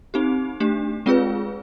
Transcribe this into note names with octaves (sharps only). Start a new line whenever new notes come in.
C4 D#4 G4
A3 D4 G4
G#3 C4 F4 G#4 B4